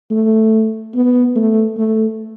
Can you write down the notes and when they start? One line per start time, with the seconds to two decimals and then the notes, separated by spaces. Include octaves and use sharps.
0.11 A3
0.95 B3
1.36 A3
1.77 A3